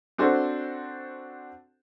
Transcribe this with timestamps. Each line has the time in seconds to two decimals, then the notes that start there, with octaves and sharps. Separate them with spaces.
0.18 C4 D4 F#4 A4 C5